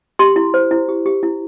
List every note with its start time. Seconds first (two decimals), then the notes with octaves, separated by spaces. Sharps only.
0.19 G4 C6
0.36 E4
0.54 C5
0.71 E4
0.89 G4
1.06 G4
1.23 E4